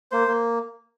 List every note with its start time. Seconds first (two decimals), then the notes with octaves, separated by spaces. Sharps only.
0.12 A#3 C5
0.28 A#3